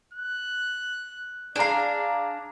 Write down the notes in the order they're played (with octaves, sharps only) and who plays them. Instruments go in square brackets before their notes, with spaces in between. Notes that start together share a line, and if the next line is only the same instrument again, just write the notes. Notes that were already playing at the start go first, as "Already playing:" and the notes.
[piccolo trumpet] F#6
[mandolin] D4 F5 [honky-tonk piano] G#4 A#5 [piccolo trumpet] D5